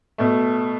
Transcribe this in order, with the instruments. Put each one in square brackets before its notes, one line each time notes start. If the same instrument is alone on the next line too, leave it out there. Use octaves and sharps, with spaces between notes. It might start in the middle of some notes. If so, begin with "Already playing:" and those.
[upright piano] B2 A3